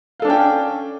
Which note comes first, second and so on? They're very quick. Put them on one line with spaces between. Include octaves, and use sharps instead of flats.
F5 A4 D4 C#4 G5